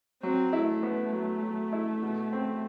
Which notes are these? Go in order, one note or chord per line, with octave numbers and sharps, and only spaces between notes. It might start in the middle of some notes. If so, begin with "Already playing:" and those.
F#3 C4
E4
A3
B3
F#3
F#3
E4
B2
C4